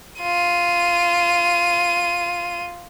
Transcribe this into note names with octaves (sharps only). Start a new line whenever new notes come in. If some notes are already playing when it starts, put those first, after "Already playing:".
F4 D#7